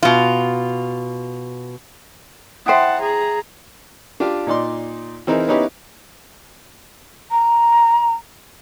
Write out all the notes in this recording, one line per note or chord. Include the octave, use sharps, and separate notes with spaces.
B2 F4
E4 C5 E5 F#5 G5 A5 D#6
G#4 A#5
D4 F4 G4
A#2 D#4 D5 C6
E3 C4 D#4 G#4 A#4
B3 C#4 D#4 E4 G4 B4
A#5